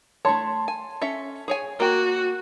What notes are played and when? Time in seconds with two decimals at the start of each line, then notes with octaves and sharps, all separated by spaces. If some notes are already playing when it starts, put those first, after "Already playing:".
0.25 A3 C#5 A5 C6
0.68 G#5
1.02 C#4 A4 E5
1.48 G#4 C#5 G#5
1.80 A#3 F#4 G5